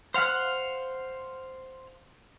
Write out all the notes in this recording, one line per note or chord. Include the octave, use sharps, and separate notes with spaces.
C5 F5 F#5 F6 F#6